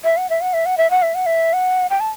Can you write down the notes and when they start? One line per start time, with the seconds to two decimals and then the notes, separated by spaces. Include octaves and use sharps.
0.04 E5
0.17 F#5
0.30 E5
0.41 F#5
0.53 E5
0.66 F#5
0.77 E5
0.90 F#5
1.02 E5
1.15 F#5
1.26 E5
1.53 F#5
1.90 G5
2.00 A5